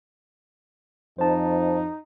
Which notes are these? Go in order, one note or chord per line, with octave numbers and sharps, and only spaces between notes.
F2 D#4 C5 A5